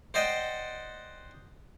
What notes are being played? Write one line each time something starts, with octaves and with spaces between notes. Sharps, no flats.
C5 D5 D#5 F#5 G5